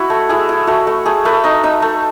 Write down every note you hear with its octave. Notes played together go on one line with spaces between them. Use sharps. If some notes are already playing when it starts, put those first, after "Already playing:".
Already playing: E4 F#4
A3
E4 G#4
E4
A3 F#4
A3
A3 G#4
A3 B4
D#4 D#5
D#4 E5
A3